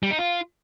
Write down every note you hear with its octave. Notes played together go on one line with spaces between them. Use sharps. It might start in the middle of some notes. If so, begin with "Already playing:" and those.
G3
D#4
F4